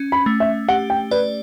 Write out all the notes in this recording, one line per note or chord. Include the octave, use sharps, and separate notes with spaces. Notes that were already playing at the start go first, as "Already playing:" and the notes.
Already playing: C#4
B5
A3
E5
G4 F#5
G5
B4 D5